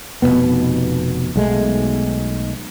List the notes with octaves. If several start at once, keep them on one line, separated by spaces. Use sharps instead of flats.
F1 F2 B2 B3
B1 G#3 A3